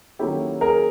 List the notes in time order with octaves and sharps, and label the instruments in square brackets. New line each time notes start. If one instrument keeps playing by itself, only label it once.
[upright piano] D#3 F#3 A#3 C#4 E4 [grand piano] G4 A4
[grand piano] G#4 A#4